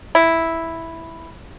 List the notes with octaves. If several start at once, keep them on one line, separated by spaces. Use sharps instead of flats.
E4